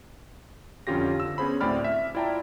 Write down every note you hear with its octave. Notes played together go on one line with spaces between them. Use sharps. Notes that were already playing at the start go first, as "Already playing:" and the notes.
F2 D3 C#4 F4 G4 A#6
D3 E6
B3 C#4 G#4 C5 B5
D2 A2 C4 D5 B5 F6
E5
E4 F4 D5 G5 A5 A#5